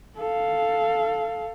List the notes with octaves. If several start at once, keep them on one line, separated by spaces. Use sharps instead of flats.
A4 F5